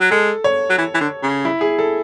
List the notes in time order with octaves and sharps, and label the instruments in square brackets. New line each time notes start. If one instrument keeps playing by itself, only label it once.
[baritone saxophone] F#3
[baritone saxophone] G#3 [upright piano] A4
[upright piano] C#5
[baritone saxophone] F#3
E3
E3
D3
C#3
[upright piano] E4
G#4
A4